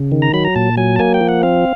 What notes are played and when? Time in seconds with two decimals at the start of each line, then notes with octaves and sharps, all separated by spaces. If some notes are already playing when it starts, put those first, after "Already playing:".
Already playing: C#3
0.12 D#3
0.22 A#5
0.33 F#3 B5
0.45 A#5
0.55 A#2 A5
0.77 F#3 G#5
0.96 A5
0.99 A#3 G#5
1.14 G5
1.21 F3
1.28 F#5
1.43 C4 F5